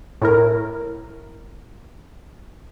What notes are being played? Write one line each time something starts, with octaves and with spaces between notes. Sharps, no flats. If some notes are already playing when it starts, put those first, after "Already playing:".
A2 E4 A#4